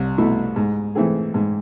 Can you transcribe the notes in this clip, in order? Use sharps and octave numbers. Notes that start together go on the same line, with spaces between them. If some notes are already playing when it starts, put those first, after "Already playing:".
Already playing: C2
B2 A3 E4
G#2
E3 A3 C4 G#4
G#2